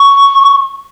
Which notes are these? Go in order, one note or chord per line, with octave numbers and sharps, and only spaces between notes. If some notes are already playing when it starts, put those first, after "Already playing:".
Already playing: C#6